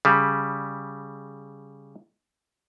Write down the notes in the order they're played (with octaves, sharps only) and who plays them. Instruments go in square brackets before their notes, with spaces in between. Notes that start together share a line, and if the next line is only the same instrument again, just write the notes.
[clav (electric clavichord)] C#3 G3